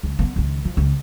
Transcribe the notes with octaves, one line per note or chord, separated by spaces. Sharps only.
C#2
A#3 B3
C#2 D#3
F3
C#2